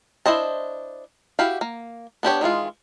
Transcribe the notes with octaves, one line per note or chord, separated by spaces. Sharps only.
D4 E4 C5 D#5 A5
E4 F#4 G4 F5
A#3
B3 D4 G4 C#5
D#3 E3 G#3 F4